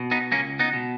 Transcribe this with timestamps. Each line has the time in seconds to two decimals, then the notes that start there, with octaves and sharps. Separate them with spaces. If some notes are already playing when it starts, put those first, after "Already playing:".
Already playing: B2
0.11 B3 D#4
0.32 C#2 A#3 C#4
0.59 B3 D#4
0.73 B2